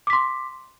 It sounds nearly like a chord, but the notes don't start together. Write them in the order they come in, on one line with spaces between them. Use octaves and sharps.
D6 B6 C6